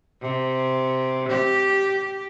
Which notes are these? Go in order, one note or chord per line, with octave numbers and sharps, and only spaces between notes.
C3
G4